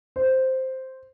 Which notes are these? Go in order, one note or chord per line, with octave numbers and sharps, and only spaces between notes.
C5